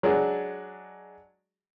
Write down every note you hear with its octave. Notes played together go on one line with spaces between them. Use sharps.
F#3 G#3 D4